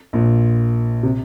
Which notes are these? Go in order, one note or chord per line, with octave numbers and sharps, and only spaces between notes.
A#1 A#2
C3